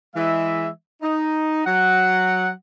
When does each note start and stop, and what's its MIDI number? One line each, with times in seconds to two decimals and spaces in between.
0.15 0.67 52
0.15 0.67 56
0.15 0.67 76
1.01 1.63 63
1.66 2.49 54
1.66 2.49 78